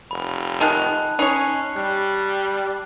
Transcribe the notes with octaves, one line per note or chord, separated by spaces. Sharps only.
F1 B5
D#3 G#3 D#4 A5 F#6
C#4 D#4 C#5 C7
G3 F#6